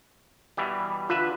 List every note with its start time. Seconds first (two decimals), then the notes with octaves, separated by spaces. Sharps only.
0.57 B2 E3 G3
1.09 D3 F4 B4 E5